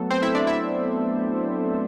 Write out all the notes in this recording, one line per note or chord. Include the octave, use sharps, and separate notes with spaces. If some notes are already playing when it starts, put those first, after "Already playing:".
Already playing: F#3 A3 B3 A4
C4 C5
E4 E5
D4 D5
E4 E5